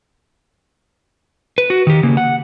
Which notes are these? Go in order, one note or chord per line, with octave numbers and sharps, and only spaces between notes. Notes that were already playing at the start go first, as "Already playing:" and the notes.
B4
F#4
D#3 G4
C#3 A#3
F#5